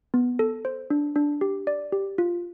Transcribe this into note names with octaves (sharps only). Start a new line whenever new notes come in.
B3
A4
C5
D4
D4
G4
D5
G4
F4